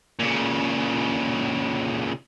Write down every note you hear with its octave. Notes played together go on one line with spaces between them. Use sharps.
A#2 C#3